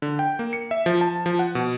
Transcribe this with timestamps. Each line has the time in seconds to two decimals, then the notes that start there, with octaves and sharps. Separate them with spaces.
0.02 D3
0.19 G5
0.39 A#3
0.53 C#7
0.71 E5
0.86 F3
1.01 A5
1.26 F3
1.39 F#5
1.55 B2